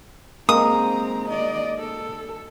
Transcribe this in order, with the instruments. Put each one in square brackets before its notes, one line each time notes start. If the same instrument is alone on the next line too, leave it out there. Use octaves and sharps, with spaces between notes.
[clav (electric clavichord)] G#3 A#3 [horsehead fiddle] C4 A#5 [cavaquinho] D#6
[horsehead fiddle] D5 D#5
A4